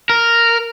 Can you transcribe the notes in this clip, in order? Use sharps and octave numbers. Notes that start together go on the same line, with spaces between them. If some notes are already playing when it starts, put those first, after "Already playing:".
A#4